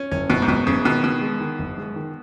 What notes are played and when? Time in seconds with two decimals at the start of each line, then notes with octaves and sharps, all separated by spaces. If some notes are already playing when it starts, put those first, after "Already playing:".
Already playing: C#4
0.11 F#1 C#4
0.29 F#1 B2
0.42 G#2
0.48 F#1 B2
0.67 F#1 C#3
0.84 B2 D#3
1.03 B2 D#3
1.21 G#3
1.40 D#3
1.59 F#1
1.78 G#3
1.96 D#3